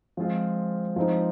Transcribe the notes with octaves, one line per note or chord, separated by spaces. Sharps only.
F3 G#3 C4 F4
F3 G#3 C4 D#4